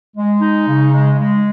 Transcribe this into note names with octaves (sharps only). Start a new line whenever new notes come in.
G#3
D#4
C#3
G#3
G#3